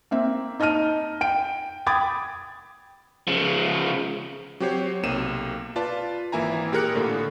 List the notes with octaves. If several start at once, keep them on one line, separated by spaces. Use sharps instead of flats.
A#3 C4 E5
D#4 D#5 A5 F6 D#7
G5 D7
G5 B5 D6 D#6 G#6 A6
C#3 F3
F#3 C4 G4 C5 C#5
B1 C3 A#3 D#7 E7
F4 B4 D5 A5
G#1 E3 A#3 E4 G#5 A#5
A#2 G4 G#4 A#4 F#6 C#7
A2 D3 A#3